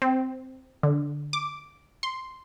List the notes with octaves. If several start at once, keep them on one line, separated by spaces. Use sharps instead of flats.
C4
D3
D6
C6